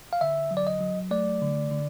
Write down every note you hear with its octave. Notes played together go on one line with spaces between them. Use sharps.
F5
D3 E5
F#3
D5
D#5
F#3
A3 D5
D3
D3